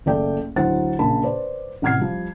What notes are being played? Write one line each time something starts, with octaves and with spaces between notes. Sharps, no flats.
F#1 A3 D5 G5
D2 F#3 E4 C5 F#5 A6
A#1 C#3 A#4 A5 B5
B4 C5 D5
A1 C3 F#5 F6 G#6 C7
F3 G3